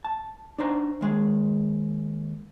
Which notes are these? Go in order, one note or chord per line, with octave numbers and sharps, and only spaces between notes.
A5
D4 D#4 C5 A#5
D#2 G#3 G#4